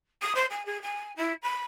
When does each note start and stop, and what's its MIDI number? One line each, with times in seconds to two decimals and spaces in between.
0.22 0.33 87
0.35 0.46 72
0.50 0.65 80
0.66 0.81 68
0.82 1.12 80
1.16 1.33 64
1.43 1.61 83